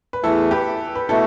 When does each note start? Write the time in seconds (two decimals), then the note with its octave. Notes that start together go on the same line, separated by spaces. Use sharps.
0.13 B4
0.23 E2 E3 A3 E4 A4
0.51 G4 B4
0.95 B4
1.09 B2 A3 E4 A4